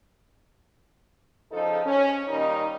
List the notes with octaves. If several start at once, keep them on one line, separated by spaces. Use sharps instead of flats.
C#3 F3 D#4 A4
C#4
A#2 D#3 G3 D#4